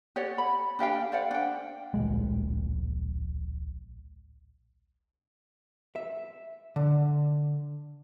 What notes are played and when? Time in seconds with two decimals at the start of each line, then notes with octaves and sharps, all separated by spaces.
0.16 G4 C#5 D5 F#5
0.38 B5
0.79 D4 G4 F5 G5
1.12 C5 D5 F5 F#5
1.31 D4 G5
1.94 D1 A#1 G#3
5.96 E5
6.76 D3